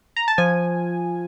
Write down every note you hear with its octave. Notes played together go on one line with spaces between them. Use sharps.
A#5
A5
F3 G#5